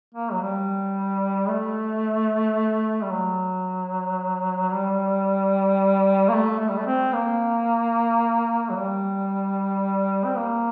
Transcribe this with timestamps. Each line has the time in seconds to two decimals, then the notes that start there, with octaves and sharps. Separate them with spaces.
0.15 A#3
0.32 F#3
0.42 G3
1.49 A3
3.02 G3
3.11 F#3
4.72 G3
6.29 A#3
6.33 A3
6.60 A3
6.69 G3
6.78 A3
6.87 C4
7.14 A#3
8.70 F#3
8.76 G3
10.25 C4
10.36 A#3